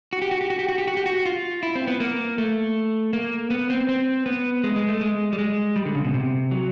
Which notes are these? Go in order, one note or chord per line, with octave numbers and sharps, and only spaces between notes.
F#4
G4
F#4
G4
F#4
G4
F#4
G4
F#4
G4
F#4
F4
E4
C4
B3
A#3
A3
A#3
B3
C4
C4
B3
G#3
G#3
A3
G#3
G3
G#3
G3
D3
C#3
B2
C3
F#3